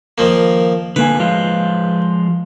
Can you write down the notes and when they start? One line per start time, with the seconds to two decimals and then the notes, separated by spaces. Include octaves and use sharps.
0.18 D#3 F3 A#3
0.96 D3 A#3 B4 G#5
1.20 F3 G#3 F4